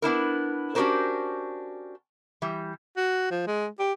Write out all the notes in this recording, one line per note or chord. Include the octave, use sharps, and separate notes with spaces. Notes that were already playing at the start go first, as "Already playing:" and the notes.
B3 D4 E4 A#4
C#4 D4 F#4 G4 A#4 C5
E3 G3
F#4
F3
G#3
G4